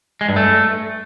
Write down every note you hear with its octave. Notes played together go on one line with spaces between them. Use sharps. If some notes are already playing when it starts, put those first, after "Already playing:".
G#3
G2
A3